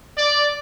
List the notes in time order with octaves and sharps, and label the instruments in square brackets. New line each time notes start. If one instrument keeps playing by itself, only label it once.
[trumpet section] D5